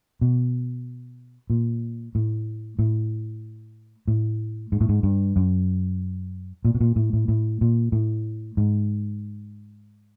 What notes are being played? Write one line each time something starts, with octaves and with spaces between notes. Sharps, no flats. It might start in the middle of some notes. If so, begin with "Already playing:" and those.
B2
A#2
A2
A2
A2
G#2
A2
G#2
G2
F#2
A#2
B2
A#2
A2
A2
A2
A#2
A2
G#2